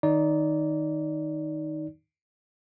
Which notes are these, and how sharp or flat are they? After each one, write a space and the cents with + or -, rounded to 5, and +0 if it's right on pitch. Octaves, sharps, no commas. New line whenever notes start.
D#3 +0 D#4 +0 D5 -25